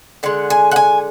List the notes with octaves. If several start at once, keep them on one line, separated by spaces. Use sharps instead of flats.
D3 G#3 F#5
G#5
F#5
G#5